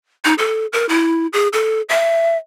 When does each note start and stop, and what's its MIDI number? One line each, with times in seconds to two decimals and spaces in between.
0.25 0.34 63
0.38 0.66 69
0.73 0.86 70
0.89 1.27 64
1.33 1.48 68
1.53 1.81 69
1.89 2.37 76